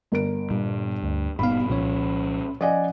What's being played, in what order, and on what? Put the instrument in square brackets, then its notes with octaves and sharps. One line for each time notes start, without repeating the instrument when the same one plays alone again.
[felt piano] G1 A#4 D7
[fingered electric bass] G2 [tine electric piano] A#2
[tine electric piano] D2
[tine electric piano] G1 D#4 F5 [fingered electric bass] G2 A#2 B3 [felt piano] B5
[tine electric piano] C2 F3 C#5 [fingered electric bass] A#2 C#4
[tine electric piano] F3 C#4 F#5 [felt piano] D5 D#5 G#5